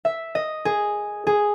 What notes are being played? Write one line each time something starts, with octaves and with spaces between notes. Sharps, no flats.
E5
D#5
G#4
G#4